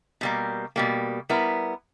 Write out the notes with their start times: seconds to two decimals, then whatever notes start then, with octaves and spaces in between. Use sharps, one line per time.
0.21 B2 G3 A#3
0.76 B2 G3 A#3
1.29 G3 B3 E4 A#4